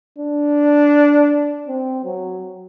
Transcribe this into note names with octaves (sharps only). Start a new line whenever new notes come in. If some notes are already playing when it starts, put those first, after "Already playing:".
D4
C4
F#3